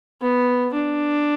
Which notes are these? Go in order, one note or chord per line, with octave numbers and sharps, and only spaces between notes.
B3
D4